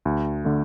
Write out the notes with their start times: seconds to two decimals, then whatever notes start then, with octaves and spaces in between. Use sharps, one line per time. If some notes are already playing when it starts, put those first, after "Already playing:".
0.05 D2
0.45 D3 A3